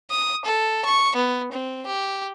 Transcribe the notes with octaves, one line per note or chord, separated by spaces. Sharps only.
D#6
A4
C#6
B3
C4
G4